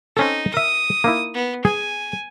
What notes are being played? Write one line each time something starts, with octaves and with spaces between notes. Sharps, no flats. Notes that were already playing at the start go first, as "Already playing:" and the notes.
C4 C#4 D#4 A4
A#4 E5 D#6
A#3 D#4 E4
B3
G#4 G#5